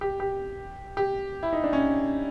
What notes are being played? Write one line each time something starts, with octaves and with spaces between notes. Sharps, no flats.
G4
G4
G4
E4
D#4
D4
C#4